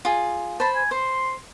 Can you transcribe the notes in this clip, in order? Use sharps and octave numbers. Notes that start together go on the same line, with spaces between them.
F4 G#4
C5 A5 B5
G#5
C5 C6